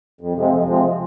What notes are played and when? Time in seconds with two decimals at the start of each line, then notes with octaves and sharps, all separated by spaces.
0.21 F2
0.36 C3 F3 G#3 C4
0.52 F2
0.68 C3 F3 G#3 C4